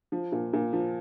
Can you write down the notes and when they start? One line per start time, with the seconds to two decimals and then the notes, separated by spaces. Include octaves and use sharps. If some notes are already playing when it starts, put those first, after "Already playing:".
0.12 F3
0.32 A#2
0.53 A#2
0.73 F3